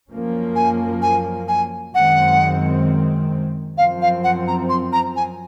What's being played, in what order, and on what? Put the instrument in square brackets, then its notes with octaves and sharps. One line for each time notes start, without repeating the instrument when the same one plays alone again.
[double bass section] F#2 F3 A#3 C#4
[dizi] G#5
G#5
G#5
[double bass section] F#2 D#3 G#3 C4 [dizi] F#5
[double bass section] F#2 F3 C4 [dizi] F5
[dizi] F5
F#5
A#5
C6
A#5
G#5